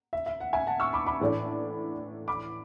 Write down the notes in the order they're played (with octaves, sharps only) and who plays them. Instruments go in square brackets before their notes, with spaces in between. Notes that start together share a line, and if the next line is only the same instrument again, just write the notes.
[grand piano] E5
E5
F#5
E5 G#5
F#5 A5
C#6 E6
B5 D6
B5 D6
[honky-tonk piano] A2 E3 A3 D4
[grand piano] B5 D6